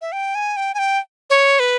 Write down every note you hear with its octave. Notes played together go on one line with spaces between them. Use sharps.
E5
G5
G#5
G5
G#5
G5
C#5
B4